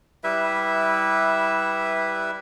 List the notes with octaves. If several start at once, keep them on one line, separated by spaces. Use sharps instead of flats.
G3 E4 B4 E5